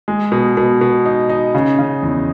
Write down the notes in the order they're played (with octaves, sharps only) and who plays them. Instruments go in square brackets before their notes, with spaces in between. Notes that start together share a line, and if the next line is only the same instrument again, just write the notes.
[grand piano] G#3
B2
B2
B2
D#4
D#4
C#3
C#3
E2